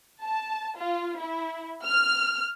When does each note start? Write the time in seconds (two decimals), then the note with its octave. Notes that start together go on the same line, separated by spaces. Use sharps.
0.23 A5
0.78 F4
1.18 E4
1.84 F6